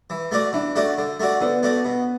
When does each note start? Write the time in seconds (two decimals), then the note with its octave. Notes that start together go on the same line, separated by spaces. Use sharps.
0.10 E3
0.31 A3 F#4 D5
0.53 E3 D4
0.76 A3 F#4 D5
0.98 D3
1.20 A3 F#4 D5
1.41 D3 B3
1.63 A3 F#4 D5
1.85 B2